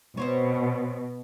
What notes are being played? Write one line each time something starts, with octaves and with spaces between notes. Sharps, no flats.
B2 C4 C5 C#5